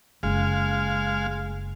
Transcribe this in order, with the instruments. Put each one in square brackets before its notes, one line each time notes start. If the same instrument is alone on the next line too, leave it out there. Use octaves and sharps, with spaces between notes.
[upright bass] F#1 [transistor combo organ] G#3 F5